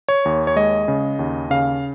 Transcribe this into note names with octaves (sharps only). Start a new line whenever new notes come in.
C#5
D#2
C#5
G#3 D#5
C#3
D#2
C#3 F5